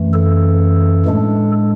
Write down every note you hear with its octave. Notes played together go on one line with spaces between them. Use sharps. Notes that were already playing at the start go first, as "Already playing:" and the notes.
Already playing: F#2 E3 A3
A4
A2 G#3 D4